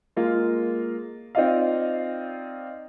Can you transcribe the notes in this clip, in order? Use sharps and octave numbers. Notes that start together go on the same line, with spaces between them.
G#3 A#3 F4
C4 D#4 F4 D5 D#5 F5